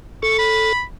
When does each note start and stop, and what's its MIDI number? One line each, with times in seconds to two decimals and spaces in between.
0.23 0.73 69
0.23 0.36 85
0.38 0.82 83